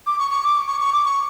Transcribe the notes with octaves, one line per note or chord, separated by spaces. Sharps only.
D6
C#6
C#6
D6
C#6
C#6
D6
C#6